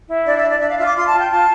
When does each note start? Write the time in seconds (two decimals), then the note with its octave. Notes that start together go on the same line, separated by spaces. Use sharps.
0.09 E4
0.26 D4 D5
0.38 E5
0.44 D4
0.49 D5
0.61 D4 E5
0.70 F5
0.78 F4 E5
0.87 D6
0.96 F4 C6
1.08 F4 A5
1.19 G5
1.31 F4 A5